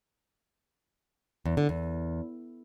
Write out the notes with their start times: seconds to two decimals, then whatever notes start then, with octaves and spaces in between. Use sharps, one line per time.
1.46 E2
1.57 D3
1.69 E2